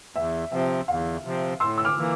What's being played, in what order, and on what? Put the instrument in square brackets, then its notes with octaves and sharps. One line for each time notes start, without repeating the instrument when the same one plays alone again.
[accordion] E2 [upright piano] E5
[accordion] C3 F3 C4 [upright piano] E5
[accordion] E2 [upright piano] F5
[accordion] C3 F3 C4
[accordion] A2 [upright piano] C6 E6
[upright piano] E6
D6 F6
[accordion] E3 A#3